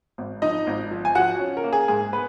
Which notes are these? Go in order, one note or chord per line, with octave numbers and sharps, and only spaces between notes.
G#1
F3 D#4 D#5
G#1
F3
G#5
F3 F#4 F#5
C#4
A#4
A#3
G#4
G#2 G#4
B3 B4